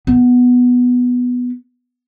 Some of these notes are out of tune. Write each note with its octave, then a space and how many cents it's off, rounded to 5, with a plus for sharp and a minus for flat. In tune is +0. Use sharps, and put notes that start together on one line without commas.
B3 +0